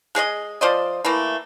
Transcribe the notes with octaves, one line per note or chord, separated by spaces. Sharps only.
G#3 G#4 D5 D#5
F3 C5 D5 D#5
E3 A3 A#3